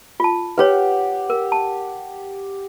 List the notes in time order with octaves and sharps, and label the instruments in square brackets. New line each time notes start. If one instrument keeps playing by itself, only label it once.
[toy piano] F4 A5
[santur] G4 F#5 [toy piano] B4 C#5
[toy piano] A#4
A5